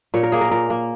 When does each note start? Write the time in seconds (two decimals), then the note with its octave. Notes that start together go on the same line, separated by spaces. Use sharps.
0.14 A#2 C#5
0.23 A#4
0.32 A#3 G#4
0.41 A#4
0.51 A#2 A#4
0.70 A#3